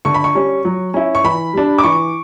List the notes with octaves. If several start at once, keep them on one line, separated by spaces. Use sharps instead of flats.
D3 C#6
B5
C#6
G3 C#4
F#3
C#4 E4
C#6
E3 B5
G3 D4
D6
E3 C#6